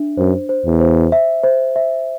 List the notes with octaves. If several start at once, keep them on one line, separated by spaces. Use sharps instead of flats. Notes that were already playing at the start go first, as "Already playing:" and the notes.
Already playing: D4 E5
F#2 C5
C5
E2
C5
E5
C5
E5